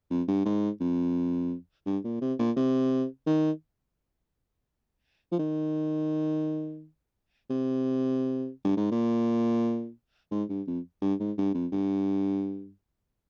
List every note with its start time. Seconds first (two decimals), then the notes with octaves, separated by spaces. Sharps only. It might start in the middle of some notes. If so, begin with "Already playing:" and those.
0.10 F2
0.28 G2
0.45 G#2
0.80 F2
1.86 G2
2.04 A#2
2.21 C3
2.39 A#2
2.56 C3
3.26 D#3
5.31 F3
5.39 D#3
7.50 C3
8.64 G2
8.77 G#2
8.91 A#2
10.31 G#2
10.49 G2
10.67 F2
11.02 G2
11.19 G#2
11.38 G2
11.54 F2
11.72 G2